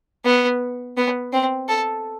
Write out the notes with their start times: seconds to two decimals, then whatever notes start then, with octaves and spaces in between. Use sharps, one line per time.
0.25 B3
0.97 B3
1.33 C4
1.68 A4